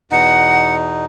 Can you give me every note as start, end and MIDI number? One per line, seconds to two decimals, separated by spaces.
0.11 1.05 40
0.11 1.05 47
0.11 1.05 63
0.11 0.75 78